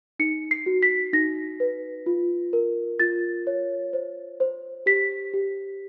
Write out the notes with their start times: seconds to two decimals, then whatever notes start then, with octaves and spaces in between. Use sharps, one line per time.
0.19 D#4 C#7
0.51 C7
0.66 F#4
0.82 B6
1.13 D#4 A#6
1.60 B4
2.06 F4
2.53 A#4
3.00 F4 A6
3.47 C#5
3.93 C5
4.40 C5
4.86 G4 B6
5.34 G4